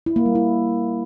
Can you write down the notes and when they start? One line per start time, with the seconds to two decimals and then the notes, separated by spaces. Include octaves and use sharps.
0.06 E4
0.16 A#3
0.26 G3
0.35 E4